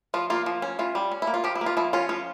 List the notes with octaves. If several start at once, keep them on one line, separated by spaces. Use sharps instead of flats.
F3 F4
A#3 F4
F3
C#4
E3 F4
G3
C#4
E4
A#3
F4
F3 G4
E4
A#3
F4
F3 E4
C#4 F4
F3 F4